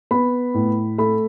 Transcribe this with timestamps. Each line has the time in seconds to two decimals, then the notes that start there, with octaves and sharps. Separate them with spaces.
0.11 B3 B5
0.54 A2
0.98 A3 B5